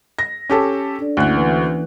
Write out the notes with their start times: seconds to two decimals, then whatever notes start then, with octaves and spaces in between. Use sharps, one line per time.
0.19 A#6
0.50 C#4 G4 A4
0.99 D4 A4 D5
1.17 D2 A#3 C#4 E4 F#6
1.35 E3 F#4 B4